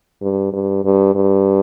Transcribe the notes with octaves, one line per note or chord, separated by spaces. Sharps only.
G2
G2
G2
G2